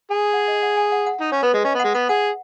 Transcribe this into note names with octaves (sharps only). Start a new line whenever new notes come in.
G#4 G#5
F#5
D#5
F#5
G#5
F#5
F#5
D#4
C#4 C#5
B3 B4
G#3 D#5
C#4 D#5
B3 F#5
G#3
B3 F#5
G#4 F#5